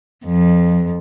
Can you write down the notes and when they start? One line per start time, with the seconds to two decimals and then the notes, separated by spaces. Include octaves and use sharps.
0.25 F2